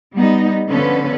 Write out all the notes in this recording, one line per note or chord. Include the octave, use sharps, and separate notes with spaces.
G3 B3 D#4
D3 F3 B3 C#4 A4 B4